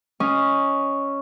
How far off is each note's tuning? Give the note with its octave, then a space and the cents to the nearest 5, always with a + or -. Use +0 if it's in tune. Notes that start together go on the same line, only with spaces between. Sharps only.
C#4 +0 D#5 +0